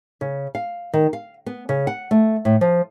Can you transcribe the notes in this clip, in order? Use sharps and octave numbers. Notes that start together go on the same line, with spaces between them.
C#3
F5
D#3
F5
B3
C#3
F#5
A3
A2
F3